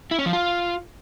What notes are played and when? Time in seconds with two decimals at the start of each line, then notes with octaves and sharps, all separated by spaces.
0.11 E4
0.19 C#4
0.26 F3
0.33 F4